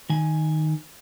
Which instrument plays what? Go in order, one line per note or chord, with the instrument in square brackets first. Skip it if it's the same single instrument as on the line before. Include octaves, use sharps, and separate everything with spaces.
[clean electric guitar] D#3 G#5